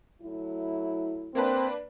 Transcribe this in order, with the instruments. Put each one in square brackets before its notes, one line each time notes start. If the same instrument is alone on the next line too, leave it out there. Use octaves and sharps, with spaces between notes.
[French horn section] F#3 A3 E4
[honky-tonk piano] A#3 D4 B4 [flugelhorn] C4